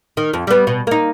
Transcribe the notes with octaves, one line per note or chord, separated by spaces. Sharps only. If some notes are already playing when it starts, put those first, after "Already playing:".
D#3
F2
G3 B3
B2
A#3 D#4